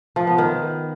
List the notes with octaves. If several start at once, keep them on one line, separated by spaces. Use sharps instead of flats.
F3
B3
D#3